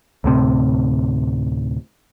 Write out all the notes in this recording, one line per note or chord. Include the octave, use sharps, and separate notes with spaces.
D2 A2 C3